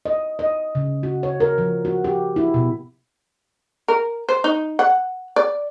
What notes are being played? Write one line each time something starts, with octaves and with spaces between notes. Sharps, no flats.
D#5
D#5
C#3
F#4
C#5
A#4
F3
F#4
G4
E4
B2
A#4
C5
D#4
F#5
D5